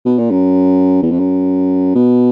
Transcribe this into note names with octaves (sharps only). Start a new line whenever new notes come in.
B2
A#2
F#2
E2
F2
F#2
B2